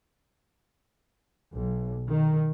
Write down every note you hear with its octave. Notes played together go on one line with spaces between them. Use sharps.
B1
D#3